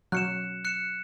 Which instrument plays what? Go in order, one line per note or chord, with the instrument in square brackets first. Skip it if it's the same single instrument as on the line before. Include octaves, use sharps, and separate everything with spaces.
[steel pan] F#3 [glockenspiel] F#6 C#7 E7
[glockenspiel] F#6 C#7 E7